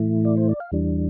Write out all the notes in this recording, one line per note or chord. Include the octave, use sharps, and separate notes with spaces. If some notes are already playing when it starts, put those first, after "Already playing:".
Already playing: A2 E3 A3 E4
D5
C5
D5
F5
E2 E3 G3 D4